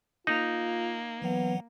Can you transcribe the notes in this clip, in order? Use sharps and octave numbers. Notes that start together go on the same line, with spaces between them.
A#3 D#4 F4
E3 F#3 B3 F#5